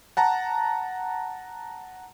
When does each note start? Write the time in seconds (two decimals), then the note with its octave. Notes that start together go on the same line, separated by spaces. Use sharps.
0.17 F#5 A5 A#5